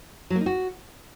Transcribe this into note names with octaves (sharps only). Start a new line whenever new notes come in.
F#3
A#3
D#4
F#4